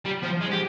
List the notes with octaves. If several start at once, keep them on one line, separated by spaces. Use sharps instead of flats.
G3
F3
G#3
G4